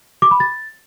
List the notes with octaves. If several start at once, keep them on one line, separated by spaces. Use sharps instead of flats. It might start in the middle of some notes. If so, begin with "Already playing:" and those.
D6
B5
A6